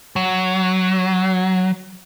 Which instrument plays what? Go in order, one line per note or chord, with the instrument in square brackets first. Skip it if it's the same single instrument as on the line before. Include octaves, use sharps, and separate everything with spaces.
[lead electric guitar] F#3